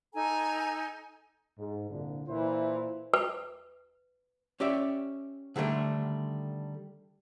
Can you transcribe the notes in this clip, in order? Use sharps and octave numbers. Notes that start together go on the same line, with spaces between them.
D#4 A4 G#5 A#5
G#2
C2 A#2 D3
A#2 E3 E4 C5
B4
C#4 G4 D5 E5
D3 D#3 G3 A3 D4